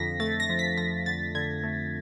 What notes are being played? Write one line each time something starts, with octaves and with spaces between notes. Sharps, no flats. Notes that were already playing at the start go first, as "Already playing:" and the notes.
Already playing: F2 D3 A#6 B6
A3 A6
A#6
F3
B6
F3 A#6
D3 A6
D3 G#6
A3